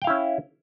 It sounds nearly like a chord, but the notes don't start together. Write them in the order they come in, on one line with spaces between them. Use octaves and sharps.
G5 F5 E4 C#4